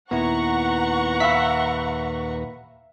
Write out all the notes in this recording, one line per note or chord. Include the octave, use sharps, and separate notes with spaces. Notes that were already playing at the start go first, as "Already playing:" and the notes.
D#2 A#2 B3 E4 B4 F#5 A#5 C#6
E5 F5 B5 E6 B6